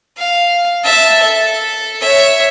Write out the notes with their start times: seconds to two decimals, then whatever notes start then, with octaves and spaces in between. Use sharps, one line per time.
0.17 F5
0.84 E5 A5
1.23 A4
2.01 C#5 E5